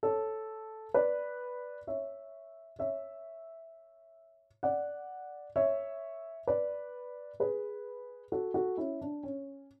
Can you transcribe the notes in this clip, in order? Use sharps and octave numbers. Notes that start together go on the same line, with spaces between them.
A4 C#5
B4 D5
C#5 E5
C#5 E5
D5 F#5
C#5 E5
B4 D5
G#4 B4
F#4 A4
F#4 A4
C#4 E4
D4
C#4